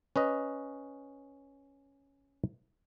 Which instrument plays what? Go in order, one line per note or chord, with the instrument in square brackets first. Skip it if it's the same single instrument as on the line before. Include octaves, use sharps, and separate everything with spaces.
[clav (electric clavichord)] C#4 B4 D#5